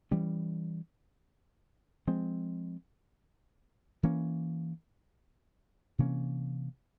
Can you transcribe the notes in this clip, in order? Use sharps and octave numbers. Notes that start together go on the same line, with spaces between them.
E3 G3 C#4
F3 G#3 C4
E3 A#3 C#4
C3 E3 A#3 C#4